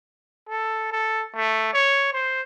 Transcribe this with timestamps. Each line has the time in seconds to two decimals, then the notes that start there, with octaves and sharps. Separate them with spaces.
0.49 A4
0.92 A4
1.36 A3
1.73 C#5
2.13 C5